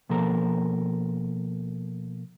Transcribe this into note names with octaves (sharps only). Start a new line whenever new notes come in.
B2 F3 A#3 A4 A#4